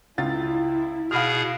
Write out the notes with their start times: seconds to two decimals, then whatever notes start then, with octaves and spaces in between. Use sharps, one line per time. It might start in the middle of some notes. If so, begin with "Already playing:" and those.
0.18 C#2 E4 F4 A6
1.11 B2 G#4 F5 B5 F6